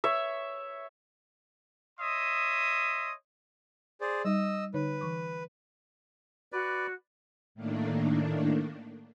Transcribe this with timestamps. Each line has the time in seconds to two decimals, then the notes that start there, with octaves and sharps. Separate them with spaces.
0.04 C#5 E5
2.00 C#5 D#5 E5 C6 D#6
4.01 G#4 C5 D5
4.25 G3 D#4 D#5 E6
4.74 D3 D#4 B4 C#5
5.01 E3 C#6 D6
6.52 F#4 B4 D5
7.55 A2 D#3 A3 A#3 D4